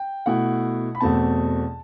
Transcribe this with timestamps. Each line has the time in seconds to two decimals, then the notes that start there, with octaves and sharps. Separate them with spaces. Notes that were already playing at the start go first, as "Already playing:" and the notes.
Already playing: G5
0.26 B2 A3 E4 F#5
0.95 B5
1.00 E2 B2 A3 C4 A5